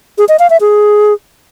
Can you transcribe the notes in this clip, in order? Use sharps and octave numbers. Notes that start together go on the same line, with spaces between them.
G#4
D#5
F5
E5
G#4